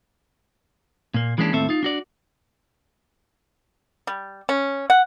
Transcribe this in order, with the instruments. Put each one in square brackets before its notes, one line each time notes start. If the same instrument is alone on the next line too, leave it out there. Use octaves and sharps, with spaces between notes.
[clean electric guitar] A#2 A#3
E3 G#3 A#3 C#4 D4
D#2 A2 C4 A4 E5
D#4 F4
D4 F#4 D5
[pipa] G3
C#4
F#5